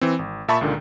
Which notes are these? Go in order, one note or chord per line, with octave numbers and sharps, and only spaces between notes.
E3 C4
G#1
A#2 E5 A5 B5 C#6
C#2 A#2 D3 D#3